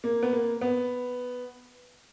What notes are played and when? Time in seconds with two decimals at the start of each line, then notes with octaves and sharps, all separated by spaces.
0.04 A#3
0.23 B3
0.33 A#3
0.61 B3